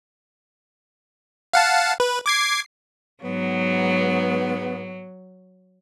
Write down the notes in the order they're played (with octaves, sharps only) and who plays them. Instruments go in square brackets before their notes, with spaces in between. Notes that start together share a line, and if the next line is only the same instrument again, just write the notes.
[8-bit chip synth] F5 F#5 A5
B4
D6 G#6 C7
[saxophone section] G#2 B3 [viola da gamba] F#3